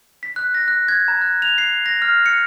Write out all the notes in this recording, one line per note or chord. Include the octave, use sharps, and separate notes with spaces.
B6
F#6
A#6
F#6
G#6
A#5
F#6
F7
C7
A#6
F6
C#7